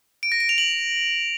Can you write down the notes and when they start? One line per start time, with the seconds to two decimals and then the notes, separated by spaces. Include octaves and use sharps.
0.23 D7
0.32 A#6
0.40 D7
0.49 F7
0.58 F#7